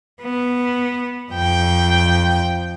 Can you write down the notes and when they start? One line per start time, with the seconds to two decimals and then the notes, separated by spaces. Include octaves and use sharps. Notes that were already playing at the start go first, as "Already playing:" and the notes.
0.22 B3
1.33 F2 G5